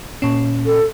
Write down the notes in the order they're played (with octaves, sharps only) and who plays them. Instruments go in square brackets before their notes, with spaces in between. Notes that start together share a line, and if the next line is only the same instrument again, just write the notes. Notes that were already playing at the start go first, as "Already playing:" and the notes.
[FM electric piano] A#2 C#4
[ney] A4